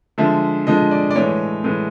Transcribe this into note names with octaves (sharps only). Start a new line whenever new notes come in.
D3 F3 G#3 E5
D3 F3 G#3 D#5
D5
D5
A2 E3 G#3 C#5
A2 E3 G#3